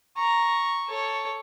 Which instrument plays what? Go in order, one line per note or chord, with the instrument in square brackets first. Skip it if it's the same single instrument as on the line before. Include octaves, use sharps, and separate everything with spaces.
[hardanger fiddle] A#5 [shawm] C#6
[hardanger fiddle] A4 C#5